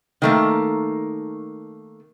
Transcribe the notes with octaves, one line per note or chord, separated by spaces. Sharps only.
D#3 A3 A#3